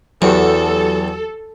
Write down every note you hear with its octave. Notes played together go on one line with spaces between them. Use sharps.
E2 F#3 F#4 G4 A4